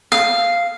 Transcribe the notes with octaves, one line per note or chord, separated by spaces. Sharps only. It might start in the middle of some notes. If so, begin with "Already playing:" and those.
F5